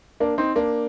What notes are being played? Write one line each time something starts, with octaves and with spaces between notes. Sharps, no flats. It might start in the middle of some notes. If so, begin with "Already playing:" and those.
A#3 D4
C4 D#4
A#3 D4